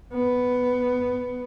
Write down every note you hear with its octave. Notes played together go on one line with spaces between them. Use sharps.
B3